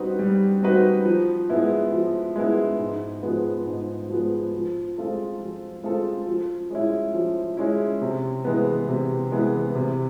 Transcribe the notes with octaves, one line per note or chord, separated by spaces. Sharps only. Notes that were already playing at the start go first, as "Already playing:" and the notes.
Already playing: G3 C4 D#4 F#4 B4
G3
C4 D#4 F#4 B4
F3
G#3 B3 E4
F3
G#3 B3 E4
G#2
F3 G#3 B3
G#2
F3 G#3 B3
F3
G#3 C4 F4 A4
F3
G#3 C4 F4 A4
F3
G#3 C#4 E4
F3
G#3 C#4 E4
C3
E3 G#3 B3
C3
E3 G#3 B3
C3